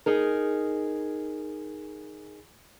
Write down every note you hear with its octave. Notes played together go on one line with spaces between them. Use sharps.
D#4 G#4 A#4